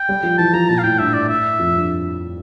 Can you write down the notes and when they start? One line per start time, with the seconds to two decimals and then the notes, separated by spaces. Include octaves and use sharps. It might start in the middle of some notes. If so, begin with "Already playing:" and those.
Already playing: G5
0.09 G3
0.23 F3
0.38 E3 A5
0.53 F3 A#5
0.69 A#2 A5
0.78 F5
0.83 A2 G5
0.99 G2 E5
1.14 D5
1.29 E5
1.59 F2
1.75 G2